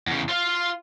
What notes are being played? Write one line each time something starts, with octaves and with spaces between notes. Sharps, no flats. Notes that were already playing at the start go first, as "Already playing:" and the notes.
E2 C#3
F4 F5